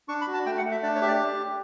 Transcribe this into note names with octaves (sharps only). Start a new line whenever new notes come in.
D4 C#6
B5
F#4
A5
A3 G5
F#5
A3
E5
D4 D5
C#5
G4 E5
D5